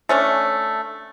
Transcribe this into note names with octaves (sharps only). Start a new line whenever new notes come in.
A3 C#4 D4